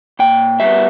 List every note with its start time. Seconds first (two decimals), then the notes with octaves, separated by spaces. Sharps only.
0.19 A#2 G5
0.60 G3 B3 E5